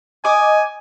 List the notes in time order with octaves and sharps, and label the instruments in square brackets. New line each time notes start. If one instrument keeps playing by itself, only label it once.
[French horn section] D#5 [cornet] G#5 [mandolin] D6 D#6